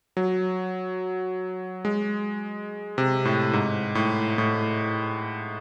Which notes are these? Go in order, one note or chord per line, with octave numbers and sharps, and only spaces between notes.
F#3
G#3
C3
A2
G#2
A2
A2